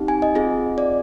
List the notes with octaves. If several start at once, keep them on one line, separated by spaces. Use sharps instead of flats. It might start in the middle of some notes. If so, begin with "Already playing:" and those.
Already playing: C4 D#4 G4
G#5
D#5
C4 F4 G#4
D5